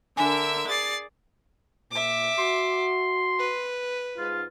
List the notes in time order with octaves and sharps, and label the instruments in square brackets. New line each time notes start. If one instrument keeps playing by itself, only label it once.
[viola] D3 A#4 [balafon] D4 G#5 [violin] E5 E6
[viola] G#4 D5 [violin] A6 C7
[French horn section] A#2 [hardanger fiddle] E5 D6
[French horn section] F#4 [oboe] C6
[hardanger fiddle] B4
[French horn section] G#2 [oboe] F4